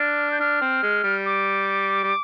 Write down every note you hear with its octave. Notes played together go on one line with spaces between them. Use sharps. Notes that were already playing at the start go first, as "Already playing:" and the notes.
Already playing: D4 F6
G6
D4 F6
C4
G#3
G3
D6
G3